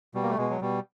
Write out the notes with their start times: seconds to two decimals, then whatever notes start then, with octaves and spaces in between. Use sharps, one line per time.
0.14 B2 G3
0.23 A#3
0.30 A3
0.37 B2 G#3
0.50 F#3
0.61 B2 G3